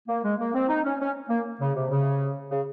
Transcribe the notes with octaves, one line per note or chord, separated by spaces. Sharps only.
A#3
G#3
A#3
C4
D#4
C#4
C#4
A#3
C#3
C3
C#3
C#3